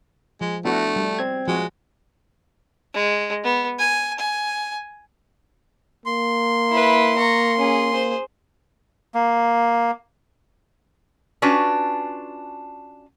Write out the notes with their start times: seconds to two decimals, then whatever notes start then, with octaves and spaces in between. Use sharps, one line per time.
0.41 F3 G#3
0.65 A3 B3 D4 E4 F#4
0.96 G3
1.19 C4 G#6
1.48 F3 G#3 F#4
2.94 G#3
3.44 B3
3.79 G#5
4.19 G#5
6.06 A#3 C6
6.70 E4 B4
7.17 A#5 C#6
7.57 C#4 G#4
7.90 G#4 C5
9.14 A#3
11.42 C#4 D4 F4 F#4 B4